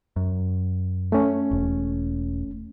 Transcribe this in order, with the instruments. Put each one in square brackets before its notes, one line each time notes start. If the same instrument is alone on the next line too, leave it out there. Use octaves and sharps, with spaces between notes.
[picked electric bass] F#2
[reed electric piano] A3 C#4
[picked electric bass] E1